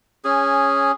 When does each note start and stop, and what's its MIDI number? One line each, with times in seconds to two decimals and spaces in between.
0.25 0.92 61
0.25 0.92 68